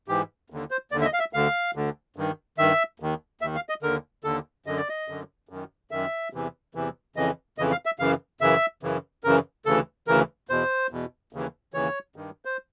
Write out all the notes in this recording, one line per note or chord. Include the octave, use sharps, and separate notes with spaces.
G#2 E3 G4
D#2 D3
C5
D#2 D3 D5
E5
D#5
F5
E5
D2 D3 F5
D2 D3
G2 D#3
G2 D#3 E5
D#2 D#3
D#2 D#3 E5
F5
D#5
D#2 D3 A#4
D#2 D3 A4
F#2 D3 D#5
D5
D#5
F#2 D3
F#2 D#3
F#2 D#3 E5
E2 C3 E3
E2 C3 E3
F2 C#3 E3 D#5
F2 C#3 E3 D#5
F5
E5
F#2 C#3 E3 F5
F#2 C#3 E3 E5
F#2 C#3 E3
F#2 C#3 E3 A#4
D2 C#3 E3 A4
D2 C#3 E3 A#4
E2 B2 C5
E2 B2
D#2 C#3 E3
D#2 C#3 E3 C#5
G2 D#3
C5